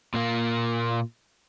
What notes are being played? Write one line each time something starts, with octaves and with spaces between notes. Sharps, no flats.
A#2 A#3